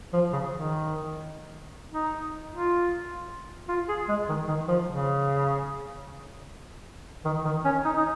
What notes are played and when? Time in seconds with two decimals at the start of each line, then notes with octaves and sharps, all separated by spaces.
0.13 F3
0.32 C#3
0.52 D#3
1.91 D#4
2.50 F4
3.68 F4
3.89 G#4
4.08 G#3
4.29 D#3
4.48 D#3
4.68 F3
4.88 C#3
7.25 D#3
7.45 D#3
7.65 C#4
7.84 D#4
7.97 D#4